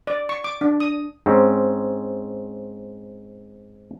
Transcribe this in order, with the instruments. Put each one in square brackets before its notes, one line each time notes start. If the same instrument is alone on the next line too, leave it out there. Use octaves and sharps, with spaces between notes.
[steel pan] D5
C#6
D6
D4
D#6
[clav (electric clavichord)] G#2 C4 C#4